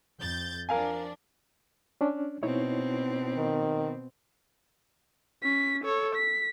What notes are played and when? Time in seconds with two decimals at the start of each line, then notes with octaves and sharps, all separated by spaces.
0.19 F2 G6 A6
0.69 F3 D4 A#4 F5 G#5
2.01 C#4 D4
2.43 B2 C4 D#4 E4 C#5
3.37 D#3
5.43 C#4 B6
5.84 A4 C#5
6.15 B6